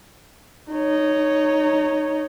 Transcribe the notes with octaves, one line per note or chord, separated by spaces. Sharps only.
D#4 C#5